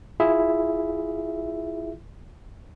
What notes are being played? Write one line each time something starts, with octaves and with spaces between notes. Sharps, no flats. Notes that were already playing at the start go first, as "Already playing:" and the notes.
E4 F4 G#4 E5